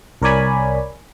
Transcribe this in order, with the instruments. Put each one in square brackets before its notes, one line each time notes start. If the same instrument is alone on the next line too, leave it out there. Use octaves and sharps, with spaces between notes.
[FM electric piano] C2 A#4 C#5 D5 G#5 B5